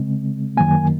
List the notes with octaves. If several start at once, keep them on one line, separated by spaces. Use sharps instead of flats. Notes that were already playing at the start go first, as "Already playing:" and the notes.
Already playing: C#3 G#3 C4
F#2 D#3 F#3 A#3 G#5